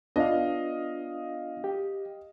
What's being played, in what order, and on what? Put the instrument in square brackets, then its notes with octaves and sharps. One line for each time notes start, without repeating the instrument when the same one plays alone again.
[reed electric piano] B3 D4 F4 [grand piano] D#5 F5
[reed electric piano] G4